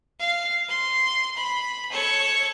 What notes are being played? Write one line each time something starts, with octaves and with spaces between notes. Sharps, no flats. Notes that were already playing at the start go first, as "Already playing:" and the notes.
F5
C6
B5
A4 C#5